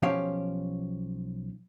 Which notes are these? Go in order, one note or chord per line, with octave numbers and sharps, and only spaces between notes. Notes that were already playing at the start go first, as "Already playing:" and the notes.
B1 F3 C#4 G4 C#5 F5